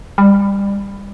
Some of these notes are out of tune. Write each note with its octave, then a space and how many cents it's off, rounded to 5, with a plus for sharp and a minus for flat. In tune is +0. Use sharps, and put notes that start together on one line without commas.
G3 +25